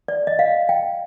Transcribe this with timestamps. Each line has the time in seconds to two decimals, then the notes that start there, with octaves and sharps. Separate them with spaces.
0.08 D5
0.27 D#5
0.39 F5
0.69 G5